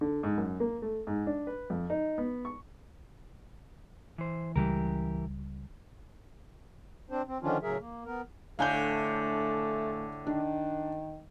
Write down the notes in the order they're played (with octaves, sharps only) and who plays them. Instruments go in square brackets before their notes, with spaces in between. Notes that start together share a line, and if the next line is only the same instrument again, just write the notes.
[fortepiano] D3
G#2
F#2
A#3
A3
G#2
D4
B4
F2
D#4
B3
C#6
[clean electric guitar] E3 C5
[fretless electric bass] C#2 C#3 G3 [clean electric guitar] E3 G4 A#4
[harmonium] C4 D4 C5
C4
D3 D#3 F3 C#4 D4 F4
A2 C#3 F#3 G#4 A#4 E5
A#3
B3 A#4
[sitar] A2 D3 [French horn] A3 [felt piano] F5 G#5 G6
[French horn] D#3 [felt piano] D4